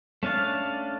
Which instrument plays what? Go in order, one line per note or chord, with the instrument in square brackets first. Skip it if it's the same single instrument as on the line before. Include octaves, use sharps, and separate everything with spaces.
[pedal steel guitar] A3 C#4 D4 D5 F5